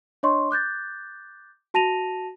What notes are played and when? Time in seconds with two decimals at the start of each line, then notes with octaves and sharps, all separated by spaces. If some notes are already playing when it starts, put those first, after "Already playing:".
0.23 D4 C#5 D#5 C6 C#6
0.51 D6 F#6 G6 A6
1.74 F#4 A5 A#6 D#7 F7